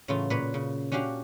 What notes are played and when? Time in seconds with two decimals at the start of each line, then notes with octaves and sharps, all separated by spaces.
0.08 A2 C#3 E3 F#3 F4
0.30 A#2 B4 C#5
0.54 C#3
0.92 C#4 D4 F#4 G4 F5